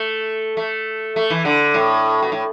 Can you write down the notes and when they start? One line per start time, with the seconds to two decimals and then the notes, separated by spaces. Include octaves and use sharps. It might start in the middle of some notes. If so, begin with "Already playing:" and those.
Already playing: A3
0.57 A3
1.16 A3
1.30 E3
1.45 D3
1.74 A2
2.23 B2
2.32 A2